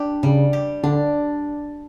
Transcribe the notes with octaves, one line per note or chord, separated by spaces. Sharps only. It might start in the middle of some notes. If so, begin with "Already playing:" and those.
Already playing: D4 G4
C#3 G3
G4
D3 D4